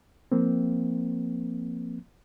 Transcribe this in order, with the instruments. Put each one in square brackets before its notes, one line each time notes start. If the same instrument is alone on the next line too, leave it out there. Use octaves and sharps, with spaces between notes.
[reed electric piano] F3 A#3 C4